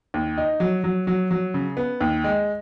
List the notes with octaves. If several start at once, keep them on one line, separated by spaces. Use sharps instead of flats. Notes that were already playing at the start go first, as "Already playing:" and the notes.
D#2
D#4
F#3
F#3
F#3
F#3
C#3
B3
D#2
G#3